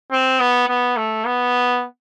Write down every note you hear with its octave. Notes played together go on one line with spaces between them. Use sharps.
C4
B3
B3
A3
B3